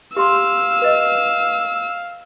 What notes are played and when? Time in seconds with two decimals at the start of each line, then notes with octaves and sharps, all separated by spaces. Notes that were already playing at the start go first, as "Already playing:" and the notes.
0.17 G4 F5 C6 D6 E6
0.82 B4 D#5